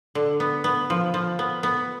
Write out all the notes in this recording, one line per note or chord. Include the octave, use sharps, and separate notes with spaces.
D3
B3
B3
F3
F3
B3
B3